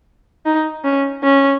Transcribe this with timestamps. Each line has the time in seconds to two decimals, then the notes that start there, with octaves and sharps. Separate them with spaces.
0.46 D#4
0.84 C#4
1.24 C#4